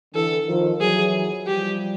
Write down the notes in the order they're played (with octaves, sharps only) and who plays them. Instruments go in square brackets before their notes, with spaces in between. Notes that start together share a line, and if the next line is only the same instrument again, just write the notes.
[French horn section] D3 E3 [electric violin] A4
[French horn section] D#3 F3
[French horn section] E3 F#3 [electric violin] G#4
[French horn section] F3 G3 [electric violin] G4